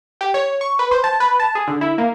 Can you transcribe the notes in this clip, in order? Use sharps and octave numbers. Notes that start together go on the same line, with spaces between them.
G4
C#5
C#6
B4
C5
A5
B4
A5
G#4
D3
E4
A#3